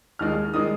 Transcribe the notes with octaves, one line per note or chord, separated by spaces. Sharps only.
D#2 D#3 G#3 F6
D#3 G#3 D#6